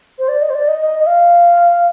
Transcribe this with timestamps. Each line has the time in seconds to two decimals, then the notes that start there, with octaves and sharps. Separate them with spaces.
0.19 C5
0.29 D5
0.42 D#5
0.50 C5
0.54 D5
0.68 D#5
0.81 D#5
0.99 D#5
1.07 F5